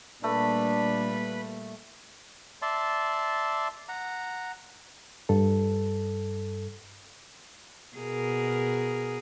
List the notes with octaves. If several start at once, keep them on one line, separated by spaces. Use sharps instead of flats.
A#2 G3 A3 A#3 D4 B4 B5
D5 E5 A5 C6
F#5 A#5
G2 A4
B2 G#4 A#4